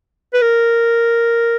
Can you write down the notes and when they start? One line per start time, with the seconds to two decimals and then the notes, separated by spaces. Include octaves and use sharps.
0.34 B4
0.42 A#4